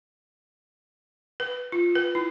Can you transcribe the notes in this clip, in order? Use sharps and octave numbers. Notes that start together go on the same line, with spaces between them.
B4
F4
B4
E4